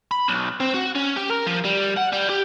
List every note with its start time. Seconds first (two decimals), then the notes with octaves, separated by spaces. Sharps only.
0.11 B5
0.28 B1
0.60 C4
0.74 F#4
0.95 C#4
1.16 G4
1.30 A#4
1.47 F3
1.64 G3
1.97 F#5
2.12 G3
2.30 G4